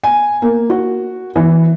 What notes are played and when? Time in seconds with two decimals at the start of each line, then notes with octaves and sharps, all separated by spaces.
0.04 G#5
0.42 A#3
0.70 F#4
1.36 E3